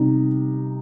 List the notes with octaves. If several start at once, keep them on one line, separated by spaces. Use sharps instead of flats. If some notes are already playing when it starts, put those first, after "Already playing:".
Already playing: C3 G3 D#4